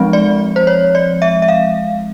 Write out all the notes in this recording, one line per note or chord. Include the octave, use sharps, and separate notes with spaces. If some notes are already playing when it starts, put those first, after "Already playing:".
Already playing: F3 G#3 C4
D5
C5
C#5
D5
E5
E5
F5